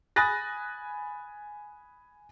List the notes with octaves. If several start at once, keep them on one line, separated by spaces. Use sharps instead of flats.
G#5 B5 D#6 F#6 A6 A#6